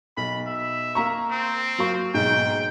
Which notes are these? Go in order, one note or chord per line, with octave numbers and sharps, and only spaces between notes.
B1 B5
E5
A#3 A#5 C#6
C4
F#3 A#3 C#6
B1 G#2 G5